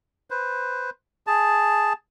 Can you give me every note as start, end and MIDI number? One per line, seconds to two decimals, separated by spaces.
0.30 0.90 71
0.30 0.90 72
1.27 1.93 68
1.27 1.93 81